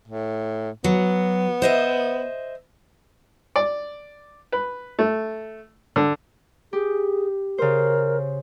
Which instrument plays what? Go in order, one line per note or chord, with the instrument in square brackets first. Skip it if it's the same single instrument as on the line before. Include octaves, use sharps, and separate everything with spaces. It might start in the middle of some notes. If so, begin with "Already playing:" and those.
[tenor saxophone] A2
[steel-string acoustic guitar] F#3 [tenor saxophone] B3
[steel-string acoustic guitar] C5 D#5 E5
[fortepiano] D5
B4
A3
D3
[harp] G4 [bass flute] G#4
[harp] C#3 C5 [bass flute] A#4